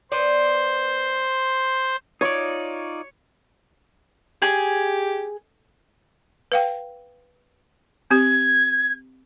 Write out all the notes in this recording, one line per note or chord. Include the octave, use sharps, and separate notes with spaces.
B3 C5 D5
D#4 F4 C#5 D5
G4 G#4
B4 F5 G5
C4 G4 G#6